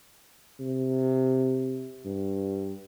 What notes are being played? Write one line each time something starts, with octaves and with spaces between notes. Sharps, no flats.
C3
G2